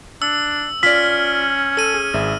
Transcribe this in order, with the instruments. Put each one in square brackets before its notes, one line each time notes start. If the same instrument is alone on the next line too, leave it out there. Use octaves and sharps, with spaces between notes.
[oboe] D4 [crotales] E6
[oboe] C#4 [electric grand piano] F4 D5 [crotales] E6 F6 [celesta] B6
[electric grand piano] A4 [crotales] E6 D#7
[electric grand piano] G#4
G#1 G#4 E5